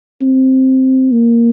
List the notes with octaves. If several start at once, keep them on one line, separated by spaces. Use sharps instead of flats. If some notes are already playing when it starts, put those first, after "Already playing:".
C4
A#3